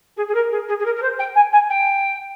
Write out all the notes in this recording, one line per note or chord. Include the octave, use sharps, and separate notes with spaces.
G#4
G#4
A#4
G#4
G#4
G#4
A#4
A#4
C5
G5
G#5
G#5
G5